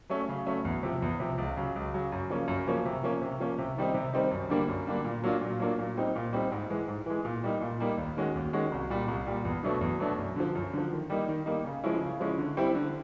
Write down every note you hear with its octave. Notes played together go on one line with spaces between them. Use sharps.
F#3 A3 C#4
C#3
F#3 A3 C#4
E2
C3 F3
E2
C3 F3
C#2
C#3 F#3
C#2
C#3 F#3
F#2
C#3 F3 A#3 C#4
F#2
C#3 F3 A#3 C#4
C3
F3 A#3 C#4
C3
F3 A#3 C#4
C3
D#3 G3 C4 D#4
C3
D#3 G3 C4 D#4
F#2
D3 G3 A#3 D4
F#2
D3 G3 A#3 D4
A#2
F#3 A#3 D4 F4
A#2
F#3 A#3 D4 F4
A#2
G3 C4 D#4
A#2
G3 C4 D#4
G#2
E3 G#3
G#2
E3 G#3
A#2
G3 A#3 D#4
A#2
G3 A#3 D#4
D#2
D#3 G#3 C#4 F#4
D#2
D#3 G#3 C#4 F#4
C2
A#2 G3
C2
A#2 G3
E2
B2 F#3 A3 D4
E2
B2 F#3 A3 D4
F#2
D3 F3
F#2
D3 F3
D#3
G3 A#3 D#4
D#3
G3 A#3 D#4
C#3
F3 G#3 C#4 E4
C#3
F3 G#3 C#4 E4
D3
G3 C4 E4 G4
D3